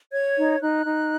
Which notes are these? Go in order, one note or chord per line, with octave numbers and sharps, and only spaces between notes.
C#5 G#6
D#4
D#4 F#6
D#4